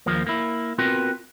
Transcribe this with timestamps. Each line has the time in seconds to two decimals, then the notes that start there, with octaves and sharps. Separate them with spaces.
0.06 D#2 F3 A#3
0.27 A#3 E4
0.79 B3 C4 F4 F#4 A#4